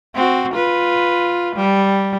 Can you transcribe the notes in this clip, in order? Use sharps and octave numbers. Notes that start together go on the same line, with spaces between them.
C4 F#4
F4 B4
G3